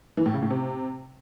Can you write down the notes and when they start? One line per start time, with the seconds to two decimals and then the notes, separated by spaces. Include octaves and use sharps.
0.17 E3
0.26 A2
0.34 C#3
0.42 A2
0.51 C3